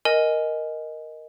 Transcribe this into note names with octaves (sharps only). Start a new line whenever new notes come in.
A#4 D#5 G#5